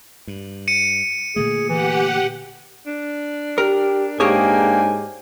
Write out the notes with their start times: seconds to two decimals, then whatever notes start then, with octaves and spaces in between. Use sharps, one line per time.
0.27 G2
0.68 C#7 D#7
1.36 A#2 D3 A3 G#4
1.69 E3 G4 F#5
2.86 D4
3.58 G4 A#4
4.20 G#2 A#3 D4 G4 G#4 C#5 G5 G#5